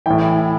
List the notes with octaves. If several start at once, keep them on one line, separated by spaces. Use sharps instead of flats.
A2 E3 G5